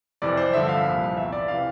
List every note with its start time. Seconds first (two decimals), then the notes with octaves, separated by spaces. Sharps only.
0.22 F2 C3 E3 D5
0.37 C5
0.53 G2 D3 F3 E5
0.69 F5
0.85 C2 A#2 F3
1.16 E2 C3 E3 E5
1.33 D5
1.48 C3 E3 F5